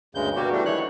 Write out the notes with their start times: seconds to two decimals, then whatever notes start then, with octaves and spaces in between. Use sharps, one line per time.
0.15 D2 G2 C#3 G#3 G6
0.36 B2 G3 A#3 F#4 G4
0.52 E3 G3 A3 D4
0.65 D#3 E3 F#3 C#5 F#6